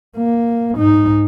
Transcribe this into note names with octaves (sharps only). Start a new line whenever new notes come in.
A#3
G#2 D#4